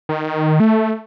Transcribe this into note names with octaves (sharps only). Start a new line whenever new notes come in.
D#3
A3